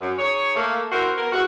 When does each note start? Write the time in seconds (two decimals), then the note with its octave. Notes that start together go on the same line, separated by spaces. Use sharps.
0.01 F#2
0.19 D#4 G#4 C#5
0.55 A3 A#3
0.91 C4 E4 F#4 A#4 C5
1.17 B3 F#4 A#4
1.32 G#3 E4 F#4